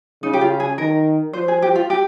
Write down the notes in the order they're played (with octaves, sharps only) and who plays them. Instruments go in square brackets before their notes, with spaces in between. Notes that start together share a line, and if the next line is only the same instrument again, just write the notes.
[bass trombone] C#3 [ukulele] D#4
[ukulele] G4
F4
G#4
[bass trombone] D#3 [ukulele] A#4
[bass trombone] F3 [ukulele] C5
[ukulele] G#4
G4
F4
G4